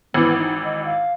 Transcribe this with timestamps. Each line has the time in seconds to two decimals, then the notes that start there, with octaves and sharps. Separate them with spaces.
0.14 G#1 E3 B3
0.38 D#4
0.64 D#5
0.85 F5